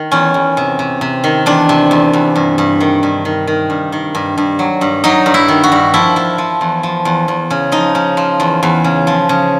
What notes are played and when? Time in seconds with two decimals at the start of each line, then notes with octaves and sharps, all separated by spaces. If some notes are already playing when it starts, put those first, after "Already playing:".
Already playing: D#3
0.11 E2 C#4
0.34 E2
0.57 C3
0.79 C3
1.01 C3
1.24 D#3
1.46 E2 D4
1.69 C3
1.91 E2
2.13 E2
2.36 G2
2.58 G2
2.81 D#3
3.03 G2
3.25 D#3
3.47 D#3
3.70 G2
3.92 D#3
4.15 G2
4.37 G2
4.59 F#3
4.81 G2
5.04 F#3 D#4
5.26 G2
5.34 E4
5.48 D#3
5.63 F#4
5.72 G2
5.94 F3 E4
6.16 F3
6.38 F3
6.61 E2
6.83 F3
7.05 E2
7.28 E2
7.50 C#3
7.72 F3 D#4
7.95 C#3
8.17 F3
8.40 E2
8.63 E2
8.84 C#3
9.07 F3
9.29 C#3